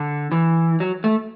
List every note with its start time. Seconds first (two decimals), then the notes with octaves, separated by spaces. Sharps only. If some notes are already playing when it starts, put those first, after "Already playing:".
Already playing: D3
0.32 E3
0.80 F#3
1.04 A3